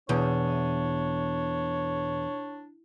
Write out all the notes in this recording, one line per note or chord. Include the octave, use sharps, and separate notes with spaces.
E2 B2 D4 C#5